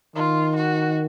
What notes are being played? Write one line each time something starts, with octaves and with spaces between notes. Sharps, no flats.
D#3 F4
F#4